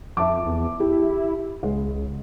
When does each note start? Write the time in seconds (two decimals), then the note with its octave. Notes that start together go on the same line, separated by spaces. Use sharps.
0.17 F2 E5 A5 D6
0.46 E2
0.80 E4 G4
1.63 C#2 G#3